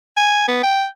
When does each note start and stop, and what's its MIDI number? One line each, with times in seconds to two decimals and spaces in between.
0.17 0.47 80
0.48 0.59 59
0.63 0.86 79